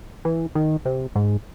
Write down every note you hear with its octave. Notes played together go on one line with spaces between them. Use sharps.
E3
D#3
C3
G#2